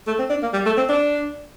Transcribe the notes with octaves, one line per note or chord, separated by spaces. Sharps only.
A3
C4
D4
A#3
G3
A3
C4
D4